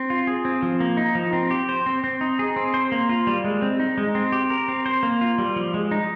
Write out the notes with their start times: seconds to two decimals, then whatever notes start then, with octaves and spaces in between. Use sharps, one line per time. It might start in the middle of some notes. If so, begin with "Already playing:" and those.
Already playing: C4
0.10 F4
0.27 G#4
0.45 C4
0.62 F3
0.80 A#3
0.97 D#4
1.15 F3
1.33 C4
1.51 G4
1.69 C5
1.86 C4
2.04 C4
2.21 D#4
2.39 G#4
2.56 C4
2.74 C5
2.92 A#3
3.09 F4
3.27 G3
3.44 G#3
3.62 C4
3.79 D#4
3.98 G#3
4.15 C4
4.32 G4
4.50 A#4
4.68 C4
4.86 C5
5.03 A#3
5.21 F4
5.38 G3
5.56 F3
5.74 G#3
5.91 D#4